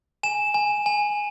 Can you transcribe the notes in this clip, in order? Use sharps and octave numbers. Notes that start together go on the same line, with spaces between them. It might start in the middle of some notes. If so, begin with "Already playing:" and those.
G#5 E7
G#5
G#5